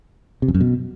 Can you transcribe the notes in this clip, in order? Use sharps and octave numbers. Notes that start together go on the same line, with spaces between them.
C3
F2
F#2
B2